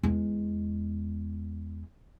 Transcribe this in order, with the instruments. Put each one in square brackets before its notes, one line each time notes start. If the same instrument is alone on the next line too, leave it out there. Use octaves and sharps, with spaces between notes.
[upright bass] E2 G#3